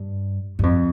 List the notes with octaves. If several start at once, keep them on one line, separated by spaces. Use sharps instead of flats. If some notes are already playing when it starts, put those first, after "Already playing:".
Already playing: G2
G2
F2